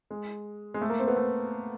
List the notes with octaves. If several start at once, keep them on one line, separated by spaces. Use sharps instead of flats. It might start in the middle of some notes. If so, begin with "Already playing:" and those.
G#3
G#3
A3
A#3
C4
B3
A3